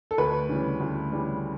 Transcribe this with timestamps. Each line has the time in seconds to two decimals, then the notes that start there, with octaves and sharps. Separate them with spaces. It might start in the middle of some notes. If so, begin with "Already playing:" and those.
0.11 A4
0.18 D2 B4
0.49 C#3 E3 G3
0.80 D2
1.12 C#3 E3 G3